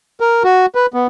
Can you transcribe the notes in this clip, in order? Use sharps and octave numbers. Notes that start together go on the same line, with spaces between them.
A#4
F#4
B4
B3